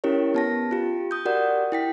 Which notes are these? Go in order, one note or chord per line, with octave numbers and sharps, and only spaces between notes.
C#4 E4 G4 A#4 C#5
B3 A5 A#6
F4 G4
D#6 G6
F#4 G4 A#4 D5 F#5
E4 G5 B6